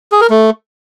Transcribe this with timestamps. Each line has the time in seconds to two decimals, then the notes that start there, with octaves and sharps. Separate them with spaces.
0.12 G#4
0.21 A#4
0.30 A3